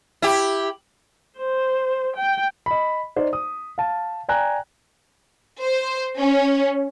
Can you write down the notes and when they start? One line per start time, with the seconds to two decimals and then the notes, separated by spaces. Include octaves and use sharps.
0.22 E4 G4
1.37 C5
2.16 G5
2.66 D#5 B5
3.16 D#4 C5 D5
3.33 D#6
3.78 F5 A5
4.28 D5 G5 G#5 A#5 F#6
5.62 C5
6.20 C#4